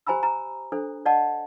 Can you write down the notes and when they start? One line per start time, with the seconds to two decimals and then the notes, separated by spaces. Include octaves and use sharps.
0.07 G4 C5 G#5 A#5 B5 E6
0.23 A#5
0.72 D4 A4 C5
1.06 D5 D#5 F#5 A5